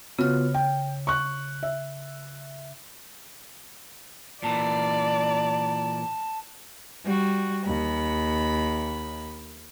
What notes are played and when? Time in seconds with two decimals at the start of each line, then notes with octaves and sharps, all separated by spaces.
0.19 C#3 B3 F4 F#4 F6
0.54 G5
1.07 C#6 F#6
1.63 E5
4.43 A#2 E3 D5 A5
7.04 G3 F#4
7.65 D#2 B5